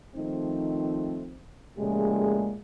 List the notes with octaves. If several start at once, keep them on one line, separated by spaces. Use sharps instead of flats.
D#3 F3 A3 C4 D#4
A#2 C#3 F3 G#3 A3 G4